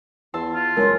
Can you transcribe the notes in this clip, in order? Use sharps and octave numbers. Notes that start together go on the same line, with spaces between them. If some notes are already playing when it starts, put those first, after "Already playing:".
E2 A5 C6 E6
F4
F#1 G#3 A#4 C#5 C6